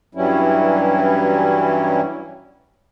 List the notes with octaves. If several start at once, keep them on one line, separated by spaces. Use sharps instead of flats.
G2 E3 F#3 G3 C#4 E4